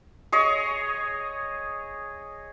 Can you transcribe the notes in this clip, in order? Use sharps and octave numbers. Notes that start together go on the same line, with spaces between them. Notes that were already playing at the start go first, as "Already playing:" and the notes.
G#4 C#5 D#5